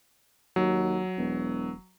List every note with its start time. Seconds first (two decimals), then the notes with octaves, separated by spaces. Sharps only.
0.56 D#2 F#3
1.18 E1